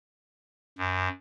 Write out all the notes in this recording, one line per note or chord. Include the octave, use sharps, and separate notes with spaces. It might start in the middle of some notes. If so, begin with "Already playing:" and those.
F#2